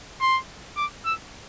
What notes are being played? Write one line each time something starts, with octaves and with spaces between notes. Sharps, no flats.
C6
D6
E6